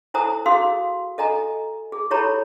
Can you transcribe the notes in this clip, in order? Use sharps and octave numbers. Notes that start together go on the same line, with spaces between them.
E4 A4 C5 G#5 A#5 D#6
F#4 G#4 F5 C6 D#6 E6
A4 D#5 G#5 A#5
G#4
E4 G4 A4 C#5 A#5 B5